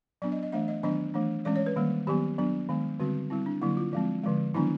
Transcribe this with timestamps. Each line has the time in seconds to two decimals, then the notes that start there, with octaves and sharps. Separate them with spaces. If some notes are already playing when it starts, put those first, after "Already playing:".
0.22 F#3 B3 D4 D5
0.32 D#5
0.43 D#5
0.52 E3 A3 D4 E5
0.68 D#5
0.83 D#3 F#3 B3 D4 D#5
1.14 E3 A3 D4
1.45 E3 G#3 C#4 D5
1.56 C#5
1.66 B4
1.76 D#3 G3 A#3
2.07 D#3 F#3 B3 G4
2.38 F#3 B3 D4
2.69 D#3 G#3 B3
3.00 D3 G3 C4 F#4
3.30 G3 C4 E4
3.46 D4
3.62 D3 F#3 A#3 E4
3.77 F4
3.93 F3 G#3 C4
4.24 D3 F3 G#3
4.54 D#3 F#3 B3 D4 E4